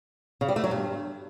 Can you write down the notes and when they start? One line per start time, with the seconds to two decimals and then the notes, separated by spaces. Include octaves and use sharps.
0.41 C#3
0.49 G3
0.56 A3
0.64 F#3
0.71 G2